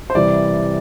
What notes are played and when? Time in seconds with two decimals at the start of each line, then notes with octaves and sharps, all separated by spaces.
0.10 C5
0.15 C3 E3 G3 D5